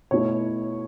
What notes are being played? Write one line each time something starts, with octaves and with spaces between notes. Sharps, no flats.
B2 A3 E4 C#5